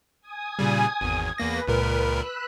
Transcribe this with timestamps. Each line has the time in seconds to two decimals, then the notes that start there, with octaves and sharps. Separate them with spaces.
0.21 G#5 D#6
0.59 A#2 C#3 G3
1.01 G#1 E2
1.38 E2 A#3 B4 A#6
1.68 C#2 A#2 A#4
2.12 B5 E6 F#6